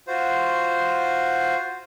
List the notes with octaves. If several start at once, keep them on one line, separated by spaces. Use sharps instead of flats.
F4 F#4 C5